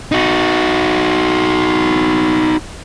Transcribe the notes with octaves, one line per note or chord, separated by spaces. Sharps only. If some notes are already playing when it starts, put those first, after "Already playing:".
D#4 F#4